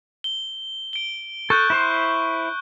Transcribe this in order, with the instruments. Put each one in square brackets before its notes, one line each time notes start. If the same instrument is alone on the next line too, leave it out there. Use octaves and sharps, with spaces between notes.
[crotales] G7
D7 G7
[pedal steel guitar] A4 [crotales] C#6 F#6 G6
[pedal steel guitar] E4 C5 C6